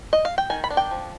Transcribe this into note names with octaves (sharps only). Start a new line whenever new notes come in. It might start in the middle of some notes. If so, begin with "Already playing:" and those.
D#5
F5
G5
D#3 G#5
B5
D4
G5
F3